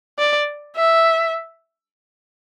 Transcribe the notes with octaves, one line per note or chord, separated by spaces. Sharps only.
D5
E5